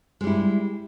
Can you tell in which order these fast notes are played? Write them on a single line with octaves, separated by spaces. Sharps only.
G#3 G3 E4